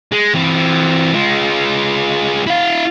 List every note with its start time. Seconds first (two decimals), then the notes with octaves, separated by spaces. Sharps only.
0.12 G#3
0.34 E3 C4
1.13 G#3 F4
2.47 E4 F5